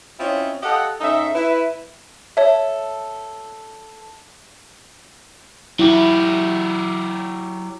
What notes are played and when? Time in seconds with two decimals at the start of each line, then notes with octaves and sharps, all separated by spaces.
0.20 C4 C#4 E4 F4 C#5 D#5
0.63 G4 A4 D#5 F5 F#5
1.01 G#2 C#4 D#4 A4 E5
1.35 E4 B4
2.37 A4 C#5 E5
5.79 F#3 E4 G4